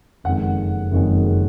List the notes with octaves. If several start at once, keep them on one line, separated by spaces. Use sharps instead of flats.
F#1 F2 D#3 G#3 F#5
F#1 F2 D#3 G#3